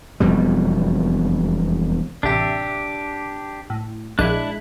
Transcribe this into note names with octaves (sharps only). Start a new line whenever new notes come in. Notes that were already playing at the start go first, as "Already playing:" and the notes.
E1 F2 B2 G3
A1 C3 D4 G4 E5
A2
A#1 G#3 D4 E4 F#6